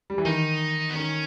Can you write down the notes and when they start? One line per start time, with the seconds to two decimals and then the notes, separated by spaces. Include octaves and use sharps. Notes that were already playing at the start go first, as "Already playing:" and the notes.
0.10 G3
0.18 E3
0.25 D#3 D#4
0.90 B3
0.95 D#3 C#4